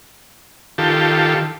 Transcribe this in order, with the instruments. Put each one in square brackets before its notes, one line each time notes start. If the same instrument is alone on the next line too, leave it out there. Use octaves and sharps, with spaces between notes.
[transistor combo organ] D#3 F4 G4 A4